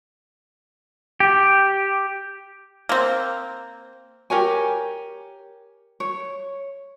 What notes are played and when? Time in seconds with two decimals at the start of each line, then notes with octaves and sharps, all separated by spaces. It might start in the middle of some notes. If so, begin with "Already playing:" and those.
1.20 G4
2.89 A#3 C4
4.30 G4 A#4 C#5 G#5
6.00 C#5